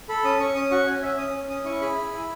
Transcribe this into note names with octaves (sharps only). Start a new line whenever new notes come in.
A4 B5
C#4 D#6
C#4 C#6
C#4 D#6
F#4 C#6
C#4 G#5
C#4 E5
C#4 D#6
C#4
C#4 D#6
E4 C#6
G#4 B5
E4
E4